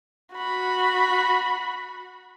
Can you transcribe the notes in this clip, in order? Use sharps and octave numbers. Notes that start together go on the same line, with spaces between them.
F#4 B5